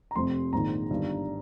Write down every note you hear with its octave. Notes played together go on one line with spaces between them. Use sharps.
A#5
F1 F2 C3 C6
A#1 G#2 D#3 A#5
G1 G2 D#3